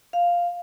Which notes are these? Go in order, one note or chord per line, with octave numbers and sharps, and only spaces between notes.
F5